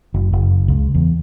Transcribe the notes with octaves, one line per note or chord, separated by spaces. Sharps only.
F#1
F#1
C#2
E2